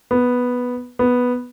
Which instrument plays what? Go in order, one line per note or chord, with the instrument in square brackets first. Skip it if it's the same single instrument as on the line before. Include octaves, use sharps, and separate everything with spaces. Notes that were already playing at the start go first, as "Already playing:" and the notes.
[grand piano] B3
B3